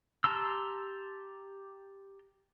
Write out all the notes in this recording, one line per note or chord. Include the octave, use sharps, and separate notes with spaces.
G4 A5 A#5 C6 E6